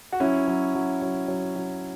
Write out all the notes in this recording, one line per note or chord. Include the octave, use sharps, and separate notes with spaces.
F#4
F#3 C#4 E4
F#3
F#3
F#3
F#3
F#3